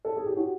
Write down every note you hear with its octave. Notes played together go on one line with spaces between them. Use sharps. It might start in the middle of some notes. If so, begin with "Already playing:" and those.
A4
G#4
G4
F#4